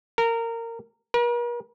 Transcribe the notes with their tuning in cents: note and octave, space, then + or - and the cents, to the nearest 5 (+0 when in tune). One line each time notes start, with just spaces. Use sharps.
A#4 -20
A#4 +45